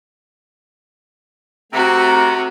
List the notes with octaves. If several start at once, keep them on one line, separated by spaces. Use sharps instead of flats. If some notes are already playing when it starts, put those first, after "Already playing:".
C3 A3 C4 F#4 A#5